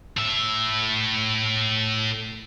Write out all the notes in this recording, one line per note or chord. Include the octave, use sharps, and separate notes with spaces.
A2 E5